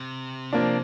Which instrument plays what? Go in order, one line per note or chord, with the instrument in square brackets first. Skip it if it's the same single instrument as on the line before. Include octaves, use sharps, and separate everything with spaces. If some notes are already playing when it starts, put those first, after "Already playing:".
Already playing: [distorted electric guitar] C3
[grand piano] F3 A#3 D4